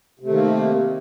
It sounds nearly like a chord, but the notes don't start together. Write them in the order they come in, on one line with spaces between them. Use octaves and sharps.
C3 A3 D#3 A#3